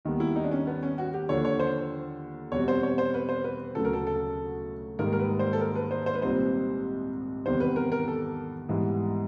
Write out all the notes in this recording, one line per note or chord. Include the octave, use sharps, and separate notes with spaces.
D#2 D#3 G3 B3
E4
D#4
D4
C#4
B3
C#4
F#4
G4
D#2 D3 F3 C#5
C#5
C5
E2 B2 G3 C4 C#5
C5
C#5
C5
B4
C5
B4
D2 C#3 F#3 A3 A4
A#4
A4
A4
G#2 D#3 G3 A#3 A#4
A#4
B4
C5
A4
A#4
B4
C5
C5
B4
C2 A#2 G3 C4 D#4 C5
E2 C3 D#3 G3 B3 C5
B4
A#4
A#4
A4
G#2 E3 G3 B3